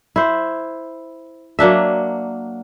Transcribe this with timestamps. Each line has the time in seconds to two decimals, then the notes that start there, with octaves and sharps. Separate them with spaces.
0.16 E4 C5
1.59 F#3 A#3 D4 E5